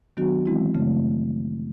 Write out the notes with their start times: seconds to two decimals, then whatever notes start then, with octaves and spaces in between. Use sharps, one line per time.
0.17 D#3 F#3 B3 D4 F#4
0.46 E3 G#3 C4 E4
0.74 F#2 C#3 F#3 A3